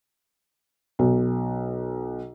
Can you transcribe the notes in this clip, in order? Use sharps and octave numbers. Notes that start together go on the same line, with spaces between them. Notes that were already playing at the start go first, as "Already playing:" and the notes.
B1